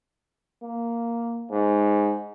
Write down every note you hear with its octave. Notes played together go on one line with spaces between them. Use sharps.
A#3
G#2